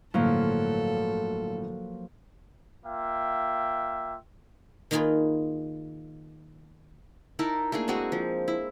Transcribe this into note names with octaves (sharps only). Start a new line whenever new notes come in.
G1 A2 F3 F#3 A#3 A4
A#3 F4 E5 G5
D#3 A#3 D#4 F4 G#4 B4
D#4 E4 A#4 A5
A3 A#3 D4 G#4
G#3 C4 F#4 G#4
F3
E4